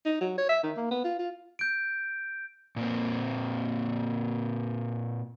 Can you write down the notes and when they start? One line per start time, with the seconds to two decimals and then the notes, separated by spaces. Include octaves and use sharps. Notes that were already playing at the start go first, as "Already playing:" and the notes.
0.06 D#4
0.21 F#3
0.38 C#5
0.49 E5
0.63 D#3
0.77 A#3
0.91 B3
1.04 F4
1.19 F4
1.59 G6 D7
2.76 A#2 A#3 C4